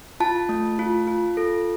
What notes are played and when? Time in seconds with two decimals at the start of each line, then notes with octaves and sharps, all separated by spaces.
0.20 F4 A5
0.49 A3
0.79 F4
1.07 F4
1.37 A4